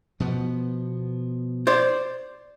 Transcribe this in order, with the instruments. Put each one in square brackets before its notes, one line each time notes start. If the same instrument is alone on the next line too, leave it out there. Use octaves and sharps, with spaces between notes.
[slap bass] B2 F3 B3
[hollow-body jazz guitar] C5 D5